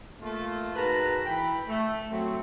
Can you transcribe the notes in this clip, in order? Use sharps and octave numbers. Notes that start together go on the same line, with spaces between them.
A3 A#3 F4
G#2 F#4 A#4 B4 A5 A#5
E3 G5 B5
A3
F#3 A3 C4